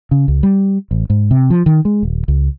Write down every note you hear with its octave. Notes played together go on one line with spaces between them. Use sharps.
C#3
C#2
G3
A1
G#2
C3
F3
D#3
G#3
D#1
C#2